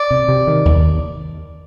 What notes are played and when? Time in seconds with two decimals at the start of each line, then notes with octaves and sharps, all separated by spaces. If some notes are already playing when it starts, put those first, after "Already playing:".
Already playing: D5
0.11 C3
0.28 C3
0.47 D#3
0.65 D#2